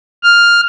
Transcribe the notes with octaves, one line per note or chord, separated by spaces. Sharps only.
F6